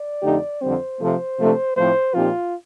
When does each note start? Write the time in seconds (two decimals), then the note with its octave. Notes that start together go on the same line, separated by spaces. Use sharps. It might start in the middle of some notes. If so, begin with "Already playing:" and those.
Already playing: D5
0.22 F2 D3 A3 D#4 G4
0.61 F2 D3 G3 C4 C5
1.00 C3 F3 A3
1.38 C3 F3 A3 D4
1.76 A2 F3 A3 C4 C5
2.15 A#2 F3 C4 D#4 F4 G4